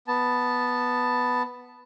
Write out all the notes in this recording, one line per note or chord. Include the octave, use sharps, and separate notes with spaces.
B3 A5